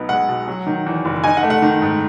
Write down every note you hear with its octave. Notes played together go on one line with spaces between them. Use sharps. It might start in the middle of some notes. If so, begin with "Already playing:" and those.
Already playing: B1 B3 D#4
G#3 F#5
B2
F#3
D#3
E2
F#1
D#4 G#5
F#5
A3
F#5
D#3
G#2